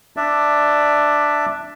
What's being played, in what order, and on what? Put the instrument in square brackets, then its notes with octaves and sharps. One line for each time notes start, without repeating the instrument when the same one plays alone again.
[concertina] D4 D5 E5